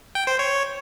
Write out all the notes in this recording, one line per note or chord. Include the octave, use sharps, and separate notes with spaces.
G5
C5
C#5